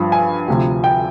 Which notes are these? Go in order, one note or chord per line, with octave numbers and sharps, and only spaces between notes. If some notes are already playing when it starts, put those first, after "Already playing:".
Already playing: G2 F3
G#5
D2 C3 F3
G5